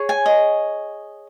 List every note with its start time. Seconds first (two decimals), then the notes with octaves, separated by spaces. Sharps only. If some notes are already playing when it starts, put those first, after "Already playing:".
Already playing: G#4 C#5
0.09 G#5
0.26 D#5